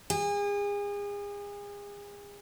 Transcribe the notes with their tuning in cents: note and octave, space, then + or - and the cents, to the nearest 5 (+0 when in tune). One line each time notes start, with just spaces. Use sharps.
G#4 -35